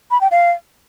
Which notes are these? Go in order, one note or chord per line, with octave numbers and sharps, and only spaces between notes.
B5
G5
F5